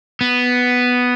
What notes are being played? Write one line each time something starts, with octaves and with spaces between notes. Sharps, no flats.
B3